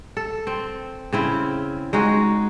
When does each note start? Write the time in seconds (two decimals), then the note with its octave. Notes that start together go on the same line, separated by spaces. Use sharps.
0.17 A4
0.47 C4
1.13 C#3 C4 E4
1.93 G#3 D#4 F#4 G#4